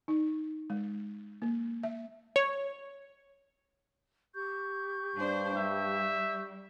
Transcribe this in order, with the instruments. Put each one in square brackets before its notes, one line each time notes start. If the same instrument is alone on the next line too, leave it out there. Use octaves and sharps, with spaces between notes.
[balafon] D#4
G#3
A#3
E5
[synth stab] C#5
[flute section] G4 C#6 G6
[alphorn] G2 [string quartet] D4 C5
[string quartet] G3 [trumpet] E5